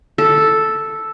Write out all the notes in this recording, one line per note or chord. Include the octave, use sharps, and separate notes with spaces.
A4